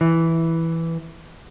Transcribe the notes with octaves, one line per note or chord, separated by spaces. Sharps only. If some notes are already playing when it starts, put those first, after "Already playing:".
E3